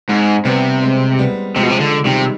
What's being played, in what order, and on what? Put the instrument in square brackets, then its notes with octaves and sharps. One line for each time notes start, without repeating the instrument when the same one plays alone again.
[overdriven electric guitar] G#2 [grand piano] C4 D#4
[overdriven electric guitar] C3 [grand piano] G3 B3
[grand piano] G#3 C4
G3 B3
[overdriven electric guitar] C3 [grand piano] F3 G#3
[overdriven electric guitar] B2
C3
D3
[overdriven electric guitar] C3 [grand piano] D#3 G3